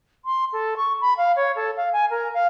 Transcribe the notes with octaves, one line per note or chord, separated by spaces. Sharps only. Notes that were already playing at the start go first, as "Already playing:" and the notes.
C6
A4
C#6
B5
F5
C#5
A4
F5
G#5
A#4
F5